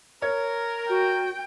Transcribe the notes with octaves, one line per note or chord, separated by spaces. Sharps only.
A#4 C#5
F#4 G5